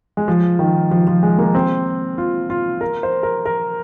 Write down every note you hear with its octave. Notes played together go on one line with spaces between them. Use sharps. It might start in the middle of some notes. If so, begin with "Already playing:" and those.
G#3
F3
D#3
F3
F3
G#3
A#3
C4
F4
F4
A#4
C5
A#4
A#4